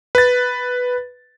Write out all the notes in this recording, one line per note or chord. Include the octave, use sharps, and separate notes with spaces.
B4 A6